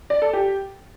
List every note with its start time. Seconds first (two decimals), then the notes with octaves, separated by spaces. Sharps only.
0.10 D5
0.22 A4
0.33 G4